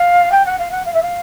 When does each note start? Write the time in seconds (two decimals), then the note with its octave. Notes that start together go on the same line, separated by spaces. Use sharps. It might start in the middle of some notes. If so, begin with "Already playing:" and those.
Already playing: F5
0.31 G5
0.46 F#5
0.59 F5
0.71 F#5
0.85 F5
0.94 E5
1.02 F5